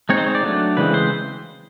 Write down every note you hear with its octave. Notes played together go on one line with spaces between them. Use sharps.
G#3 C4 D#4 C#5
C5
C#5
D5
F#3 A3 D4
C#3 E3 G#3 C4 B4
C5